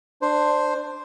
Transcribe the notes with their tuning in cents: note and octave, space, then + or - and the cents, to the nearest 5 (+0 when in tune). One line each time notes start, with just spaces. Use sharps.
D4 +15 C5 +0